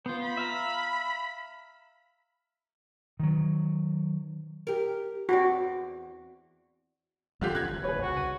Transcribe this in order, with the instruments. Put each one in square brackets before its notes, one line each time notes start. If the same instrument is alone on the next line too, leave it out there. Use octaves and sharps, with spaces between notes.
[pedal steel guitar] B3 F4 [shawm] C5
[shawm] B5
[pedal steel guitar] E5 F5 A#5
[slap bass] D#3 F#3
[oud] G4 A#4
[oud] E2 C4 D5 [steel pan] F#4
[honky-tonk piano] D3 F4 G4 [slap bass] F3 G#3 A3
[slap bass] C#2 B3 C#4 [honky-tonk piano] F#6 G#6
[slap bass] D#1
[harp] G#4 C#5 [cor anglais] B4
[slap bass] C2 C#3 [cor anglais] F#4
[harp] D#7